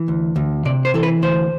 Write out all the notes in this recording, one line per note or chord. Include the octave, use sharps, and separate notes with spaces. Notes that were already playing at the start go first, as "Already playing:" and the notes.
Already playing: E3
D2
D2
C3 D5
C5
E3 A4
B4
D2 C5